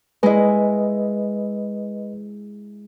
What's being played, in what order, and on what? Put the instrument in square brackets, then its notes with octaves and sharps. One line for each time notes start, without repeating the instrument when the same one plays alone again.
[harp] G#3 E4 [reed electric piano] B4 D#5